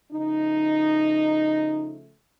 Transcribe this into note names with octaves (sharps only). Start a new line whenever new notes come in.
C#3 F3 A3 D#4